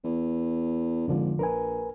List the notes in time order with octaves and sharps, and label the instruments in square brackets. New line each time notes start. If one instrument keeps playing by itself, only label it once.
[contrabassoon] E2
[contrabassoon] G#1 [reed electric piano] F2 D3 F3
[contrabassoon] A#1 [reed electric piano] A#4 B4 G#5